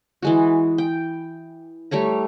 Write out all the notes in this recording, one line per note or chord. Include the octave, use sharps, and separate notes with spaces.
E3 G#3 F#4
G5
G3 A3 C#5 A#5